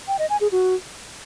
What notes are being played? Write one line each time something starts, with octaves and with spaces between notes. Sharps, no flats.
G5
D#5
G#5
G#4
F#4